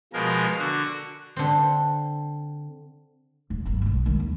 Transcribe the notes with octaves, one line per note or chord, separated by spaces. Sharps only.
B2 F3 G#3 A#4
D3 F#4
D3 C4
D1
G1 F#2
B1 C#4
D#3 G#3
D#2